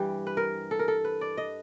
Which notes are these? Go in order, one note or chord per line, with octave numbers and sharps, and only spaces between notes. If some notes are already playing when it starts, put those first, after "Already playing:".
Already playing: G2 E3 G3 G4
B4
A#4
A4
A#4
A4
B4
D5
D#5